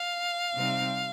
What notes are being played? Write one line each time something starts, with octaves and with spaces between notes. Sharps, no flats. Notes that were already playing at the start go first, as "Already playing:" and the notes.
Already playing: F5
C3 G3 C4 D#4